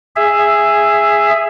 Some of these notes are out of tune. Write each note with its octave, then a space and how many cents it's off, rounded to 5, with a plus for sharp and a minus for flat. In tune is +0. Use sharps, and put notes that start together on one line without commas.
G#4 -5 E5 +10